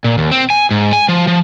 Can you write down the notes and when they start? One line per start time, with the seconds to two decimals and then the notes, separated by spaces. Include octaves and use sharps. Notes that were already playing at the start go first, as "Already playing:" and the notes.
0.04 A#2
0.18 D#2
0.31 C4
0.50 G#5
0.71 G#2
0.93 G#5
1.09 F3
1.27 F3